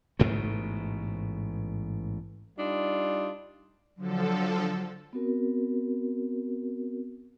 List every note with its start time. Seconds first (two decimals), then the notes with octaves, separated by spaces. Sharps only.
0.19 A1 G#2 B2 A3
2.58 G3 D4 D#4 F4
3.97 D3 F3 F#3 A4
5.13 B3 C4 F#4 A#4